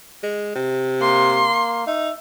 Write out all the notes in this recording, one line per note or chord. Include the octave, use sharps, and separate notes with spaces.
G#3
C3
A#3 C6
D#4 E5